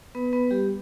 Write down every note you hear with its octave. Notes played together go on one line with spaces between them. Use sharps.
B3 B4
B3 B4
G3 G4